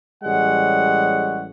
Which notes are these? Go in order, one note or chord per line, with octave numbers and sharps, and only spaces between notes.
A1 G3 G#3 C#5 F#5